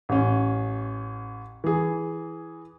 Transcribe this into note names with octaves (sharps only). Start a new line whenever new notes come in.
A1 C#4
E3 G#4